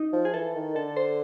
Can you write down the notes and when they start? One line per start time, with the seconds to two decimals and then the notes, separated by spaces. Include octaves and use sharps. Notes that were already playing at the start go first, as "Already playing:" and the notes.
Already playing: D#4
0.12 F3
0.25 G#4
0.34 E3 A4
0.55 D#3
0.75 D3 A4
0.97 C5